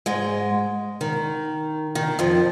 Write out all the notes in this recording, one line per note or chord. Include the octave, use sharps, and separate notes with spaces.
G#2 G#3
D#3
D#3
F2 F3